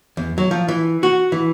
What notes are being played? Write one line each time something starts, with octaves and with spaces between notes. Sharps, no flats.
E2
F#3
F3
E3
F#4
E3